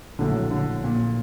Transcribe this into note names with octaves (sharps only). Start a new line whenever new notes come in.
A#1 A2 D3 F#3
D3
A#2